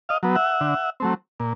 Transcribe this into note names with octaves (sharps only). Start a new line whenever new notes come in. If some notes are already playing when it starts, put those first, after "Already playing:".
D#5 F5
F#3 B3
E5 F#5
D3
F#3 A3 C4
A#2